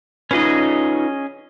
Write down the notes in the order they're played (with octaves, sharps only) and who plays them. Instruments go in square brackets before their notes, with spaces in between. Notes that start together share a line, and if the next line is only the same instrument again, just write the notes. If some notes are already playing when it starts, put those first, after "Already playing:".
[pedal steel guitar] C#4 G#4 D#5 [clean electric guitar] D#4 F4 B4